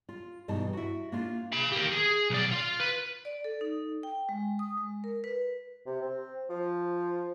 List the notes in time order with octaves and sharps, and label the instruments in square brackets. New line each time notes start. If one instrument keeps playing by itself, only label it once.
[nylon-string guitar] F4
G2 B2 E3 D#4 A5
E4 F#4
A#3 D4 F4
[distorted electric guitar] F5 B5
G4 A#4
G#4
B1 D5
F4
B4
[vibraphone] D5
A4
D#4
G5
G#3
D#6
G#3
A#4
B4
[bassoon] C3
C4
F3